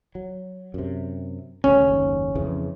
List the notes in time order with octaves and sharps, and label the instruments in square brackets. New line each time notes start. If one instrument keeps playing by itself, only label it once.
[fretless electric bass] F#3
F#2 C3
[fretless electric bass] D#1 D2 C#3 [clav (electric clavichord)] C#4
[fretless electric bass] F#1 D#2 G#2
F2 C#3 E3